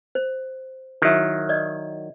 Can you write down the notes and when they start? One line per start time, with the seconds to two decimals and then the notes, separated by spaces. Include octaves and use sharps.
0.15 C5
1.02 D#3 F#3 E4 F#4 E5
1.49 D5 D#5